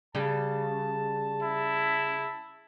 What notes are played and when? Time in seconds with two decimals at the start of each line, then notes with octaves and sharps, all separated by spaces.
0.15 C#3 G3 A5
1.42 E4